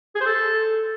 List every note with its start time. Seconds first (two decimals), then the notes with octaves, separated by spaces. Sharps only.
0.15 G#4
0.20 C5
0.26 A4